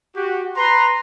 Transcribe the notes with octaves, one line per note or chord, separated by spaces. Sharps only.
F#4 G4
B4 A#5 C6